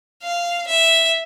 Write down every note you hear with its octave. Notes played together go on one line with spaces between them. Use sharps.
F5
E5